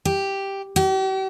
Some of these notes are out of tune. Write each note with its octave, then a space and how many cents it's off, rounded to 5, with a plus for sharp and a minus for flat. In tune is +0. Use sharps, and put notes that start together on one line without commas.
G4 +0
G4 -45